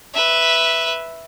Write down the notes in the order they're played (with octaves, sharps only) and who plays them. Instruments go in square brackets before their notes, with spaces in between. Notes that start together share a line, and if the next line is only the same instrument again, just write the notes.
[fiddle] B4 E5